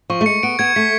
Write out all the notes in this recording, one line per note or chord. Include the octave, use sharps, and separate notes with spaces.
F3 C#6
A3
G#3 C#7
B3 D7
B3 G#6
A3 B6